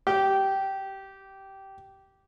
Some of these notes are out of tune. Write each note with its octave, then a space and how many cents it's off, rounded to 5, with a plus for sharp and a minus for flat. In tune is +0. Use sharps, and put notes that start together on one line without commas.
G4 -15